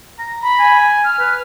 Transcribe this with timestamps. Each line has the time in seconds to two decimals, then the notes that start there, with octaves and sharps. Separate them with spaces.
0.19 A#5
0.42 B5
0.59 G#5
1.04 F6
1.19 B4